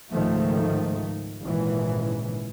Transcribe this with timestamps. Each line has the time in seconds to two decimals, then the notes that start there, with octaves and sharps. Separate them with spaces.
0.11 C#2 G#2 D#3 F3 A3
1.42 G#1 A#2 C#3 E3